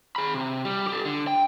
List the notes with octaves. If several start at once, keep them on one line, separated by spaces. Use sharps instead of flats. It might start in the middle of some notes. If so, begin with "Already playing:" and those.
G#4 B5
C3
G3
G4 A4
D3
G5